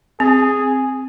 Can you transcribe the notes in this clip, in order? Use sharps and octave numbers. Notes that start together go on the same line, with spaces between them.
C4 G#4